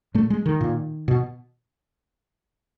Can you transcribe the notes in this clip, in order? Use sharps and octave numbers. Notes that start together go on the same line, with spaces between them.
A#2 A3
G#3
D#3
A#2
B2